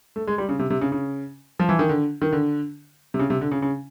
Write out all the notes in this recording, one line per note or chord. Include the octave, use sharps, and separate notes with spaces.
A3
G#3
G3
C#3
C3
C3
C#3
C#3
F3
E3
D#3
D3
D#3
D3
C3
C#3
C3
D3
C#3
C#3